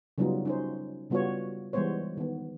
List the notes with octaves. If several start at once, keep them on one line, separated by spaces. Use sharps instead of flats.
C#3 F#3 G3 B3 D#4 F4
C#4 D#4 C5
C#3 G3 B3 F4 F#4 C#5
E3 G3 G#3 B3 C5 C#5
D#3 B3